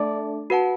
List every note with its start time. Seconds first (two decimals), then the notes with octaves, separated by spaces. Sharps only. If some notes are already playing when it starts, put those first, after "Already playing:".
Already playing: A3 D4 A4 D5 E5 A5
0.50 F#4 B4 F#5 A5